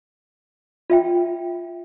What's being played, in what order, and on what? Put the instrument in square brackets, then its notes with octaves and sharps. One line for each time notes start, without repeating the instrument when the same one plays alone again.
[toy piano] F4 E5 G5